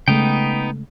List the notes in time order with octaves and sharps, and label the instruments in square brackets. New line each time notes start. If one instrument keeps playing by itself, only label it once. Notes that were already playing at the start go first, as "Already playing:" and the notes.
[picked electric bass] C#3 G#3 A3 [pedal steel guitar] B3 D#4 G5